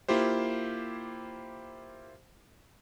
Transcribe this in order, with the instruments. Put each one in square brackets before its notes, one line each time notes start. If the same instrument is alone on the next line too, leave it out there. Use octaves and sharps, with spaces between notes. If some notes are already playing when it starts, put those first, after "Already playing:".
[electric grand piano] A#3 E4 F4 G4 C5